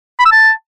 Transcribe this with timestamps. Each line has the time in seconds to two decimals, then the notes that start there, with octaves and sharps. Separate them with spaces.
0.19 B5
0.25 E6
0.32 A5